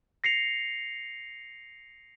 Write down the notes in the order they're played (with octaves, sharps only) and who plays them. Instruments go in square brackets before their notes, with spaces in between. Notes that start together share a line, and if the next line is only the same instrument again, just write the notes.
[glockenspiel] A#6 C7 C#7 F7